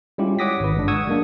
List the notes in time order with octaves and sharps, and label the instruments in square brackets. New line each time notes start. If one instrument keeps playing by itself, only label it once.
[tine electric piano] G3 G#3 C#4 E4 F4 G4
C#5 F#5 D6 D#6 A#6 B6
G#1 B4
G1 G#3 D4
F#5 C#6 D#6 E6 G#6
F#3 G#3 A#3 D4